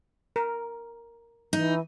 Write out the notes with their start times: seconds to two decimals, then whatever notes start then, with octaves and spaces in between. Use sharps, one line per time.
0.36 A#4
1.53 E3 D#4